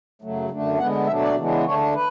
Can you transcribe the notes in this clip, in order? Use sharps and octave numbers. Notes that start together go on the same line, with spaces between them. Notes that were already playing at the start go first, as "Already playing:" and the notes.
F#2 C#3 F#3 A3
F#2 D3 A3 D4
D3 G#3 B3 F#5
B2 F#3 A3 D4 E5
D5
C#3 E3 G#3 B3 D4
D3 A3 D4 C#5
B4